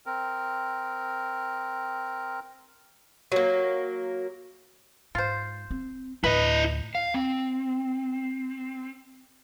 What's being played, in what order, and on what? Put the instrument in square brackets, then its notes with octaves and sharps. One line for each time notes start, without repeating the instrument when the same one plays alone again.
[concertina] C4 A#4
[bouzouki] F#3 A#3
[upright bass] G#2 [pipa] F4 C5
[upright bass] C4
[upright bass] D2 A2 [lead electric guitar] E4 D#5 [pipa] B4
[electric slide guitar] F5
C4